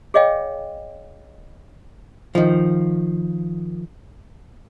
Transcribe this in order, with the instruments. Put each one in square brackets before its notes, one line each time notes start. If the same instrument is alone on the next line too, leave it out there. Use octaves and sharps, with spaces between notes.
[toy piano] G#4 C#5 D#5 F5 G5 G#5
[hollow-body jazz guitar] D#3 F3